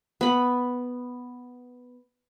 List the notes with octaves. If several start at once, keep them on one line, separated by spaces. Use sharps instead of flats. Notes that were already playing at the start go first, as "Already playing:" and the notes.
B3 B5